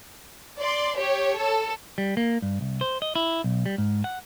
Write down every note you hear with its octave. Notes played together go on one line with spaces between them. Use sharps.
D5 C6
G4 C#5
A4
G3
A#3
G2
C2
C5
D#5
E4
B1
G3
G#2
F#5